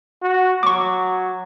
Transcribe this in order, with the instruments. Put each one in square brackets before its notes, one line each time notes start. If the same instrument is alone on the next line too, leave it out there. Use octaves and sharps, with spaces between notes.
[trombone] F#4
[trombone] F#3 [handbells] C#6 D6